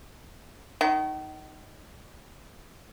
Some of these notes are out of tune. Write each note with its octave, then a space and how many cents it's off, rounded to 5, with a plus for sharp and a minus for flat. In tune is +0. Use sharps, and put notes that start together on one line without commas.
D#3 +0 G5 -45